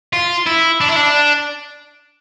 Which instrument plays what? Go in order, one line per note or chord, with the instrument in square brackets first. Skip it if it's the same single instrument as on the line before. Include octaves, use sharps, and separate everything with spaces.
[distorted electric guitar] F4
E4
D4
E4
D4